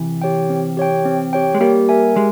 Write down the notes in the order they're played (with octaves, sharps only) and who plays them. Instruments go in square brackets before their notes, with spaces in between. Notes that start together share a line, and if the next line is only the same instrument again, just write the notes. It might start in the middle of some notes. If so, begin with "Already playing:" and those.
Already playing: [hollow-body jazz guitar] C3 E3
[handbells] G4 C#5 G5
C4
G4 C#5 G5
C4
G4 C#5 G5
[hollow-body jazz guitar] G#3
[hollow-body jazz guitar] G3 A#3 [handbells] G4
[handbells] A#4 E5 G#5
[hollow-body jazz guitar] G#3 [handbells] G4